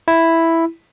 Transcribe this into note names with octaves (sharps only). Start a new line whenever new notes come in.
E4